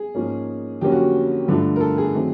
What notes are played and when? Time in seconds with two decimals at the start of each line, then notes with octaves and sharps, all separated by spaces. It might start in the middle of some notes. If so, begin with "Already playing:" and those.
Already playing: G#4
0.15 G#2 F3 A#3 C#4
0.81 F2 D3 F#3 A#3 C#4 G4
0.92 F#4
1.48 G2 D3 F3 A3
1.76 A#4
1.81 A4
1.98 G#4
2.14 D#3 F#3 A3 C4